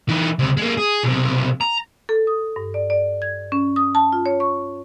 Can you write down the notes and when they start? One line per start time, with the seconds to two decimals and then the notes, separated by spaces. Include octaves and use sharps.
0.09 E3 D#4
0.39 C#2 C3
0.57 G#3 A#3
0.77 G#4
1.04 B1 C3
1.61 A#5
2.09 A4
2.27 D#6
2.56 G2
2.74 D5
2.90 D5
3.22 G#6
3.52 C#4
3.76 D#6
3.95 A5
4.13 F4
4.26 C#5
4.40 C#6